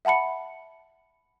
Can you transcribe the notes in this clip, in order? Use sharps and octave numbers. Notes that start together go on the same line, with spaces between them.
E5 F#5 A5 B5 C#7